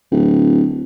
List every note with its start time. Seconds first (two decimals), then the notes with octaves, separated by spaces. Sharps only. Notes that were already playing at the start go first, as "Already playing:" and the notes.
0.11 D1